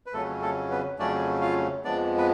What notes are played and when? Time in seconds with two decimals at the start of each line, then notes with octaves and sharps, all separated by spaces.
0.06 B4
0.13 F2 C#3 F#3 A3 C#4 A4
0.42 A3 A4
0.71 B3 B4
0.99 F2 C#3 F#3 A3 C#4 D4 D5
1.42 F4 F5
1.84 F2 F3 G#3 B3 D4 D5
2.18 B4